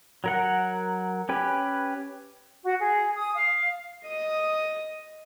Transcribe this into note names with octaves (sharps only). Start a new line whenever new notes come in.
F#3 A#4 F#5
C#4 G4 B4
F#4
G#4
D#6
F5
D#5 D#6